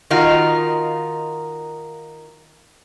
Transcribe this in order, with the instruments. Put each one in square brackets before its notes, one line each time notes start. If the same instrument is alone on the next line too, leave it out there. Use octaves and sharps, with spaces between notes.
[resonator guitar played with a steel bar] D#3 D#4 F4 F#4 A#4